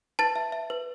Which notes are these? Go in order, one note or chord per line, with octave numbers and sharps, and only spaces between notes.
B4 A5 A6
E5
E5
B4